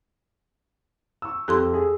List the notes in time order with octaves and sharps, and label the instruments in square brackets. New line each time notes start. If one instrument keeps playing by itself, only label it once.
[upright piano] C#6 E6
[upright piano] F2 [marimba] G4 A4 C6
[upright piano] G#4